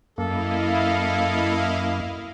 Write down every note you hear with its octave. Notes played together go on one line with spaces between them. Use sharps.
F#2 A#3 E4 A4 D#5 F5